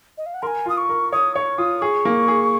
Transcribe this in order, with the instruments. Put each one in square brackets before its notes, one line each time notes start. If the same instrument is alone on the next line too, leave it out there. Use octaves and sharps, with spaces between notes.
[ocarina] D#5
F5
F#5
[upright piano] A#4 [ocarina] G#5 C6
[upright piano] F4 [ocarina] D#6
[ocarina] C#6
[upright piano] A#4
[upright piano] C#5 [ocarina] D#6
[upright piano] C#5 [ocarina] C#6
[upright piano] F4 [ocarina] D#6
[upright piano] G#4 [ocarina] C#6
[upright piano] A#3
G#4